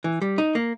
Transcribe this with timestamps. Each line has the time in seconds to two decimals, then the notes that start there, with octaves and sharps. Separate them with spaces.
0.04 E3
0.22 G3
0.38 D#4
0.55 A#3